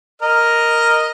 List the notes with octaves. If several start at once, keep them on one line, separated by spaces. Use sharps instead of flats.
A#4 D#5 F6